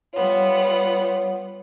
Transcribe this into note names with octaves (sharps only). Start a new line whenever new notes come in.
G3 B3 F4 C#5